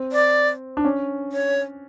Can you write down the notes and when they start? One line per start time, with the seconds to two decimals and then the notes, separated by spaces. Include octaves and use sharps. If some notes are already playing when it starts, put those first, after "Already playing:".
Already playing: C4
0.12 D5
0.77 D4
0.85 C#4
1.32 C#5